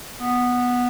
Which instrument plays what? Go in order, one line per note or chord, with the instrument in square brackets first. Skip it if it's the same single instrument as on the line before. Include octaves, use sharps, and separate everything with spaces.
[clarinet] B3